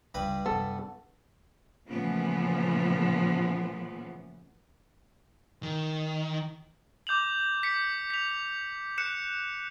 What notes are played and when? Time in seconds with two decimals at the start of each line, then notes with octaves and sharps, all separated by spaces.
0.14 C#2 G2 G3 B4
0.46 F#2 C3 B3 A4
1.90 A#2 C#3 E3 F3 A3 B3
5.63 D#3
7.07 D6 G6 F7 F#7
7.63 B6 C#7
8.10 B6 F7
8.98 F#6 C#7 E7